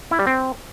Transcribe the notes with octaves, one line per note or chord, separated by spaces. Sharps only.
E4
G3
C4